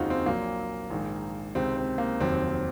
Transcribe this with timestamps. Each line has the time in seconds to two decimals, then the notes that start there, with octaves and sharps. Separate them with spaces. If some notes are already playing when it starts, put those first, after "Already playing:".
Already playing: F1 D#2 C#3 G#3 C4 D#4 F4 F#4
0.10 C4
0.26 A#1 A#2 F#3 A#3
0.90 A#1 G#2 D#3
1.55 C#2 C3 D#3 C4
1.77 C4
1.98 A#3
2.20 F1 D#2 D#3 F#3 C4